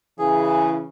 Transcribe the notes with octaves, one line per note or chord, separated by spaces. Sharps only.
C#3 E3 G#4